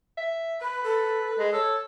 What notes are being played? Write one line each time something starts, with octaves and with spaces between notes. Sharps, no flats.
E5
B4 B5
A4
G#3
A4 C#5